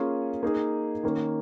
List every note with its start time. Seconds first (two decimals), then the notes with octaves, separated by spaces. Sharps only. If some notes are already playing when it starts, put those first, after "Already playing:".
Already playing: A#3 C#4 F4 G#4
0.43 A#3 D#4 G#4
1.03 D#3 A#3 C#4